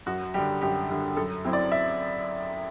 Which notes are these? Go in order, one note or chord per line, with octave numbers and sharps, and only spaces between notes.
F#2 F#4
D3 G3 G4
F#2 G4
D3 G3
F#2 A4
F#3 C4 E4
D5
E5